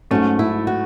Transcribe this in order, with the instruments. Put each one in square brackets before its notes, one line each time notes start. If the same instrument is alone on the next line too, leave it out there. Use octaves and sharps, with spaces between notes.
[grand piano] G#2 F#3 A3 [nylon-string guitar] C#4
[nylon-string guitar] E4
F#4